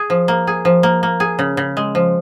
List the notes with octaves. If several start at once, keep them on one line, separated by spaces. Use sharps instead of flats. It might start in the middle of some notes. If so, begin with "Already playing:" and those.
Already playing: G#4
F3
A#3
G#4
F3
A#3
A#3
G#4
C#3
C#3
G#3
F3